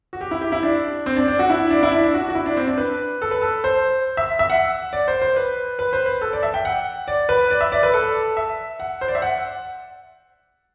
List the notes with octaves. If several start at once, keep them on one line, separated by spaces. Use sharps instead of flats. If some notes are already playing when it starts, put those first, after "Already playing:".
F#4
G4
E4
G4
E4
D4
C4
D4
D4
F#4
E4
D4
E4
D4
F#4
F#4
E4
D4
C4
D4
B4
A4
B4
A4
C5
E5
E5
F#5
D5
C5
C5
B4
B4
C5
B4
A4
D5
E5
G5
F#5
D5
B4
D5
E5
D5
B4
A4
E5
F#5
C5
D5
E5
F#5